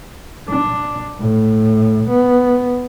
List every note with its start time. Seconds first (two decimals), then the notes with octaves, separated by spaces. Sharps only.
0.49 D4
1.20 A2
2.09 B3